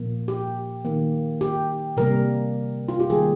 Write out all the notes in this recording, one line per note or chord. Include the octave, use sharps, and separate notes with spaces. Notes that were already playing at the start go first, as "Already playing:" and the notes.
Already playing: A#2 F3 A#3
G4
D#3 A#3
G4
C3 G3 A#3 A#4
F4
G4
D#3 G3 A#3 G#4